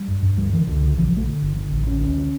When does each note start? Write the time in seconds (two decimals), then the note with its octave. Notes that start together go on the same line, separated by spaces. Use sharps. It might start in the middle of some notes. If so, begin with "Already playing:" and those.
Already playing: G3
0.08 G2
0.23 G2
0.37 D2 G3
0.52 D3 E3
0.67 C#2 D3
0.82 C#3
0.97 A#1 E3
1.07 F3
1.12 A#1 A3
1.27 D3
1.42 G1
1.56 D3
1.72 A1
1.87 D3 C#4
2.01 D2 C#4
2.17 D3